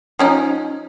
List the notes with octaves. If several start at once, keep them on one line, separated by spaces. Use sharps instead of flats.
F3 C#4 D#4